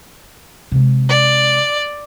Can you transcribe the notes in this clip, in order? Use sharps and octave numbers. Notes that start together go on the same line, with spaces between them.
C3 G#3
D5